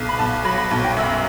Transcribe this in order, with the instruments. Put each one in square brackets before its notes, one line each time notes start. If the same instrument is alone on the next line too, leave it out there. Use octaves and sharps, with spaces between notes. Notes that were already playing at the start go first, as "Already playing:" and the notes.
Already playing: [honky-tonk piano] B1
B5
B1 A5
F#3 B5
B5
B1 A5
G5
F#2 E5